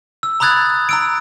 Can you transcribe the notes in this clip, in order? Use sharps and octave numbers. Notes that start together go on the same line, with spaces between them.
E6
A#5 B5 D#6 F#6 G#6 A6
A#5 E6 D7